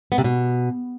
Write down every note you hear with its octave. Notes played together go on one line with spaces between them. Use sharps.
B3
C3
B2